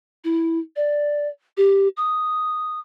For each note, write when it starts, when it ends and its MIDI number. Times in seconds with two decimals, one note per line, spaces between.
0.24 0.59 64
0.76 1.28 74
1.57 1.88 67
1.97 2.79 87